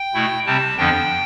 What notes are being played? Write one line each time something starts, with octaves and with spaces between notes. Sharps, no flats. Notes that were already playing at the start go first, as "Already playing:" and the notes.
Already playing: G5
B2 A3 E4
C3 G3 C4 A5
F2 D3 F3 B3 D4 G5